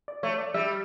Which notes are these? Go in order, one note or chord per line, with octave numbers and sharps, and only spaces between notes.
D5
A3 C#5
D5
G3 E5